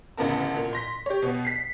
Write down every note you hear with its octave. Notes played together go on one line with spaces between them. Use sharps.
A1 D2 C#3 B3 A#4 A5
A#2
C6 A#6 B6
G4 C#5
B2 B3
B6 C7